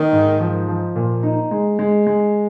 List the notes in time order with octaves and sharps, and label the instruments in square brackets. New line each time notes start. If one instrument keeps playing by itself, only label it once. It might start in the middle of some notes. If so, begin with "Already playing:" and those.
Already playing: [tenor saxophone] D#3 [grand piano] A#3
[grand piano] G#2
F3
F3
A#2
D#4
G#3
G#3
G#3